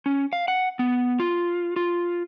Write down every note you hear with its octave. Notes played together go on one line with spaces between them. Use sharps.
C#4
F5
F#5
B3
F4
F4